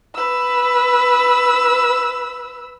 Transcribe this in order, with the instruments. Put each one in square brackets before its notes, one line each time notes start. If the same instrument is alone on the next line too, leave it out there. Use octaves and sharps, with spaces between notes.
[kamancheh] B4 E6